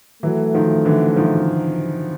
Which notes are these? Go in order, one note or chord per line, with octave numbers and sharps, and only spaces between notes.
E3 F#3 A3
D#3 F3
D3 E3
D#3 F3